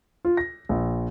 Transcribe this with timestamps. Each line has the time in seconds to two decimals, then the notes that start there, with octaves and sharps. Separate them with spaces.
0.25 F4
0.37 A#6
0.69 A#1